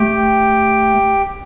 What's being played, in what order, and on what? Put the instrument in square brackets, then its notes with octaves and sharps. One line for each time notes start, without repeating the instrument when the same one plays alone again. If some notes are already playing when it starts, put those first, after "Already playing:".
Already playing: [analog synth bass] A3 [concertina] G4 G5